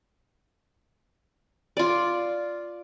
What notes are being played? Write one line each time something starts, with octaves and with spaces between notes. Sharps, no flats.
F4 D5